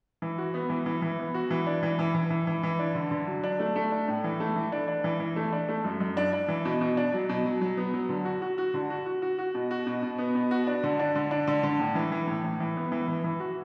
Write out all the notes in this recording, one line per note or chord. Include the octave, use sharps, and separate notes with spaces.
E3
F#4
B3
E3
E3
E3
B3
F#4
E3
D4
E3
E3
E3
E3
E3
E3
D4
D3
D3
F#3
D4
A3
A3
D4
A2
E3
A3
E3
D4
D4
E3
E3
A3
D4
A3
F#2
F#2
D4
D4
E3
B2
B2
D4
F#3
B2
F#3
F#3
B3
F#3
D3
F#4
F#4
F#4
D3
F#4
F#4
F#4
F#4
B2
F#4
B2
B2
B3
B2
F#4
D4
D3
D4
D3
D4
D3
D3
A2
E3
E3
A2
A2
E3
B3
E3
E3
E3
F#4